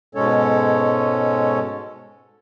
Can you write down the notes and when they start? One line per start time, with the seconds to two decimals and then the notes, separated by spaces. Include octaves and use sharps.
0.15 G#2 B2 G#3 C#4 A4 C#5